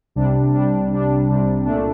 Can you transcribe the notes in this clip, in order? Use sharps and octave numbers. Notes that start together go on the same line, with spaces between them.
C2 C3 G3 D4
C2 C3 G3 D4
C2 C3 G3 D4
C2 C3 G3 D4
C2 A#2 A3 D4